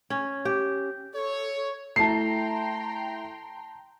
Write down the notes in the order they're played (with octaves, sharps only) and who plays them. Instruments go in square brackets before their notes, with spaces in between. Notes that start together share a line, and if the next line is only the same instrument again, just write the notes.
[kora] C#4
G4
[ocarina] A4 [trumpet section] C#5
[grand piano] A3 E4 [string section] G5 A#5 C6 [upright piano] A5 C7